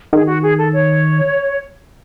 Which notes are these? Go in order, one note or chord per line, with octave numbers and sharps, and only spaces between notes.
D#3 G#4
F#4
G#4
A4
C#5